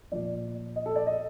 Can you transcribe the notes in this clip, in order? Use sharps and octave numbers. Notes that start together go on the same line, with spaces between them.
A#2 F3 D5
D#5
A4
D5
D#5